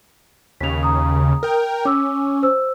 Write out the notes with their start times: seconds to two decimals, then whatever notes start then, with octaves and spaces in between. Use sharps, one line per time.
0.61 D#2 C#3 B6 F7
0.83 A#5 D#6
1.43 A#4 G5
1.85 C#4 D6 E6
2.43 C5 E6